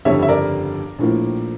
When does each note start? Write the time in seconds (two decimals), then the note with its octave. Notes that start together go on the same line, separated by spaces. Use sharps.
0.05 G1 F2 C#3 G3 C#5 E5
0.22 E5
0.28 A#4 D5
0.99 A#1 A2 F3 A#3